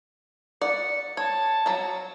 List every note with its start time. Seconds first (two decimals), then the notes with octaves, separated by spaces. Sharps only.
0.62 D5 F#5 C#7
1.17 C#5 A5
1.66 F#3 A#5